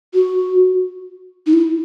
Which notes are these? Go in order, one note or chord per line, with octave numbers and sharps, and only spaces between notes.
F#4
D#4
E4